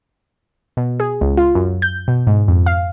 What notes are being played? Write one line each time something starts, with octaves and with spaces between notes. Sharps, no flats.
B2
G#4
C#2
F4
F#2
G6
B2
G#2
F2
F5